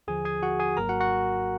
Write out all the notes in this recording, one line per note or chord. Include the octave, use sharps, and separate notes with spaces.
D#2 D3 F3 G#4 G#5
G#4 G#5
F#4 F#5
G#4 G#5
G#1 G#2 F#3 A#3 A#4 A#5
F#4 F#5
F#4 F#5